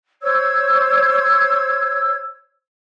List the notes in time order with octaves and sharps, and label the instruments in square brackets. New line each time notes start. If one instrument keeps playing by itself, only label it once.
[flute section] C5 C#5 E6 G#6